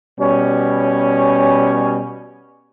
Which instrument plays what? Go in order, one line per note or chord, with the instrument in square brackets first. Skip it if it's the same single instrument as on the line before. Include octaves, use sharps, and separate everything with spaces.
[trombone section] B2 G3 C#4